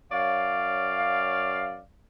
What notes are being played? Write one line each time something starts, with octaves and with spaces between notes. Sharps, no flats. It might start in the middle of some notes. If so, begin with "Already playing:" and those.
F#2 C#5 D5 F5